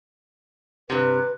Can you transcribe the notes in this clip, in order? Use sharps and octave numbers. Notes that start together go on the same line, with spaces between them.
G2 C3 B4